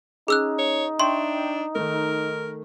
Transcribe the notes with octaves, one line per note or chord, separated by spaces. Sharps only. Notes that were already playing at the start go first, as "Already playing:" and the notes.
C#4 D#4 G#4 E6 F#6
C#5
D4 E5 G5 C6 C#6
D#3 A3 A#4